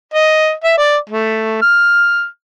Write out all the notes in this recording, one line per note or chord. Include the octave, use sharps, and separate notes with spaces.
D#5
E5
D5
A3
F6